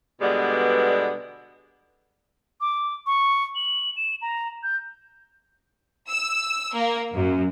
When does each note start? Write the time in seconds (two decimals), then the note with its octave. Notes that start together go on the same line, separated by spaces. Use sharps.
0.21 B2 D3 G3 G#3 B3
2.61 D6
3.06 C#6
3.55 F#7
3.96 E7
4.22 A#5
4.63 G6
6.09 E6
6.73 A#3
7.13 F#2